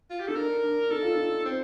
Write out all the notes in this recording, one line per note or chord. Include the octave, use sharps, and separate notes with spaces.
F4
G4
D#4 A4
D4 A#4
D4
D#4 A4
F4
D#4
C4